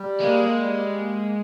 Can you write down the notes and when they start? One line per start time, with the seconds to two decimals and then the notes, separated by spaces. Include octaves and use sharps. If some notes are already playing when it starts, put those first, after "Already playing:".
Already playing: G3
0.21 G#3 A#3
0.57 G3
0.94 A#3